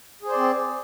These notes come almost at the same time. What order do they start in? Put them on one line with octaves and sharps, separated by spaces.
G#4 C5 D5 C4